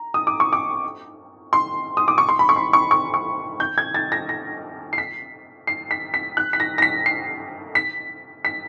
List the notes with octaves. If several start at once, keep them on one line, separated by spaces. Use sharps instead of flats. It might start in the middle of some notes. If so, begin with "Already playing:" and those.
Already playing: A#5
D#6
D6
C#6
D6
C6
D#6
D6
C#6
C6
B5
C#6
C6
C#6
C#6
C#6
G6
G#6
A6
A#6
A#6
C7
B6
C7
B6
B6
F#6
B6
A#6
A#6
B6
C7
B6
B6